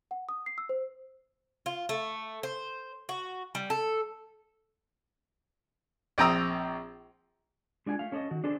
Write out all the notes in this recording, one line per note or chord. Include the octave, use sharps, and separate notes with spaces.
F#5
D#6
C7
E6
C5
F4
A3
C5
F#4
G3
A4
A#1 C4 G5 A#5 D#6 E6
G#3 D4 F4 G5 G#5
A3 F5
C#4 A4 D5 D#5
D#3 F#4
D4 G#4 A4 C5